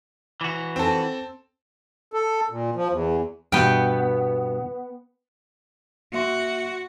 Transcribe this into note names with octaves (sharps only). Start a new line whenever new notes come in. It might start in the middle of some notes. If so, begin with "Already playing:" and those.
E3 F#4
C4 A4
A4
A#2
F3
E2
G2 B2 B3 G5
A#3 F#4 E5 C6